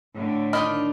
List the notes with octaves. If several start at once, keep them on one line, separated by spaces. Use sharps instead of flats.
A2 D3
D#3 D4 F4 D#5 B5 F6